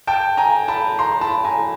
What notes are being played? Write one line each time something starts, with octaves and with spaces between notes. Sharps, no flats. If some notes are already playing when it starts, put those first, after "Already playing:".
G5 A5
G#5 A#5
A5 B5
A#5 C6
A5 B5
G#5 A#5